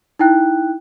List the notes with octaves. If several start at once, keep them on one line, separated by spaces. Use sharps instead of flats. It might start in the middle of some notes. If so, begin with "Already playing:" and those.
D#4 E4 G5 F#6